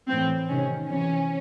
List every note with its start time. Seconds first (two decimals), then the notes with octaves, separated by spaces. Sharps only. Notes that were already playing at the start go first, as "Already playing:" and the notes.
0.08 A2 E3 C4
0.49 C3 D#3 C#4
0.89 C3 E3 C#4